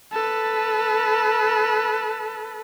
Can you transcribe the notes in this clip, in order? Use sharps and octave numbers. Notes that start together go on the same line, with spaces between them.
A4 B4